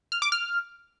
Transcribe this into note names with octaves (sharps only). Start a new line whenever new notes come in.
F6
D6
F6